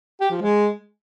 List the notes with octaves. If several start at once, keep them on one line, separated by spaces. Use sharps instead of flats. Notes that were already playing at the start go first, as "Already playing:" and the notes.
G4
F3
G#3